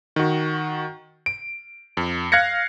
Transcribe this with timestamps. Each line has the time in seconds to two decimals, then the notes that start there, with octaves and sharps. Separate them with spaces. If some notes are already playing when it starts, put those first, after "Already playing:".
0.16 D#3 F#4
1.26 D7
1.97 F2
2.32 F5 F#6 G#6 A#6 C#7